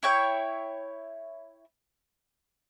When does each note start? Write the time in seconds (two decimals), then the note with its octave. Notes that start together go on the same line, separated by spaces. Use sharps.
0.03 E4 C#5 G5